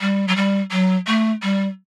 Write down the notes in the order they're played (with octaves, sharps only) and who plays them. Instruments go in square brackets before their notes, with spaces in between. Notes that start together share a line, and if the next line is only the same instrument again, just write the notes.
[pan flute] G3
F#3
G3
F#3
A3
G3